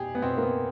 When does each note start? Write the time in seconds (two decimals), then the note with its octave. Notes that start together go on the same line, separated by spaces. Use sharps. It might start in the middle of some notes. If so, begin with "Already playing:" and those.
Already playing: B2 G4 G#4
0.15 B3
0.22 B2 C4
0.38 A#3
0.43 B3